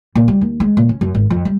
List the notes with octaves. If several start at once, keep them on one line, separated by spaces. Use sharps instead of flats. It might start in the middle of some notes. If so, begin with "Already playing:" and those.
A#2
G3
D#2
G#3
A#2
C#4
F#2
G#1
F2
G3